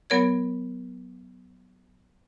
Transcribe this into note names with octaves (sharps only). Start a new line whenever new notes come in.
F#3 B3 A#4 C#5 G#6